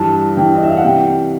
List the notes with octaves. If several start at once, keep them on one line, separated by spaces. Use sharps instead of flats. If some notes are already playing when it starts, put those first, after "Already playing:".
Already playing: G2 E3 A5
E3 G5
D#5
E5
F5
F#5
C3 G5